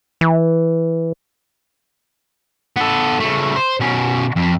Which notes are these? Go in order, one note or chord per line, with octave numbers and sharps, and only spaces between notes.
E3
B3 A4
C#3 A3
C5
B2 C#4
F2